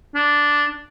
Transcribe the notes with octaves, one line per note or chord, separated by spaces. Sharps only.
D4